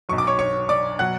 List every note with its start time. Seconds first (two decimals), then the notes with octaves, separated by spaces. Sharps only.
0.09 B1 B2 F#3 C#6
0.18 D6
0.27 C#5 C#6
0.39 C#5 C#6
0.69 D5 D6
0.99 B2 F#3 F#5 F#6